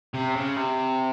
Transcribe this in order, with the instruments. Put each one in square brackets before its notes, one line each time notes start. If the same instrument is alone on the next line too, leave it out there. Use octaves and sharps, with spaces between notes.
[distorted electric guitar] C3
C#3
C3